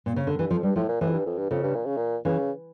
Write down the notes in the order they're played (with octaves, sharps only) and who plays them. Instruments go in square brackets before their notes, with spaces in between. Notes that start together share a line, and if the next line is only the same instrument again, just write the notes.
[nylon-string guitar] A#2
C#3
D3
[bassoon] G2 [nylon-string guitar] E3
[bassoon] F2 [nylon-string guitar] F3
[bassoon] G2 [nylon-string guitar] G3
[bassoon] A2 [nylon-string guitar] F3
[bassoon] A#2
[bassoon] A2 [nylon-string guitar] E3
[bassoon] F2
G2
F2
G2
[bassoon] F2 [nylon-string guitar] C#3
[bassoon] G2
A#2
C#3
A#2
[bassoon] C#3 [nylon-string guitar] E3